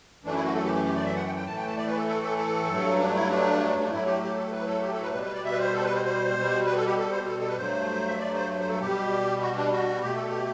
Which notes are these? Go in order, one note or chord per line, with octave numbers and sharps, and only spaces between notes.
F#2 E3 A3 D4
E4
F#4
A4
G4
G4
G4
D5
E5
F#5
G5
G5
A2 E3 A3 A5
G5
A5
D5
B4
A4
A4
A4
A4
G2 F#3 A3
D4
E4
D4
D4
A2 F#3 A3 E4
G4
G4
A4
B4
A4
G4
A4
B4
B2 G3 B4
B4
D5
E5
B4
C5
A4
C5
B4
C5
C5
B2 G3
B4
A4
G4
A4
C5
A4
A4
B4
G2 F#3 A3 C5
E5
D5
C5
C5
A4
B2 G3 G4
F#4
D4
F#4
B2 A3 G4
A4
G4